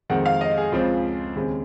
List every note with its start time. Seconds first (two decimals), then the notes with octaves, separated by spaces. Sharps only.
0.09 F2 D#3 G#3 C4 F#5
0.26 F5
0.41 D#5
0.58 G#4
0.72 C#2 C#3 F3 C4 F4
1.36 D#2 C#3 G#3 C4